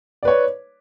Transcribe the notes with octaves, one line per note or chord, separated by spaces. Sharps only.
B4 C#5 D5